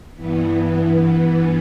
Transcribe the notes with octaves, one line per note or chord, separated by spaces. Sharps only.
G2 E3 B3